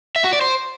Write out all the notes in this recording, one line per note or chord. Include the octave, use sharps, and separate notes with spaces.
E5
F#4
D5
C5